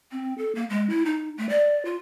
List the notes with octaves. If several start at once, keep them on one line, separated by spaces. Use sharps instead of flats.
C4
A4
A#3
G#3
E4
D#4
A3
D5
F4